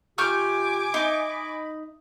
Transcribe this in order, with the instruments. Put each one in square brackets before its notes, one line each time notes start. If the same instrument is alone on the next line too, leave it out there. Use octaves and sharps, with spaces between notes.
[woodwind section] C3 F4 G4 [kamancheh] G#5 D6 [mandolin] C#6 F6 G6
[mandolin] D#4 [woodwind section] D#5 B5